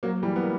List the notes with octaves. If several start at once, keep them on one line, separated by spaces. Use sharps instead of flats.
F#3 A#3
E3 G3
B3
A#3